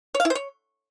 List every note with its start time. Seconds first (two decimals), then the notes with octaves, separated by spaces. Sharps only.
0.15 C#5
0.20 F5
0.25 E4
0.30 C5
0.35 C#5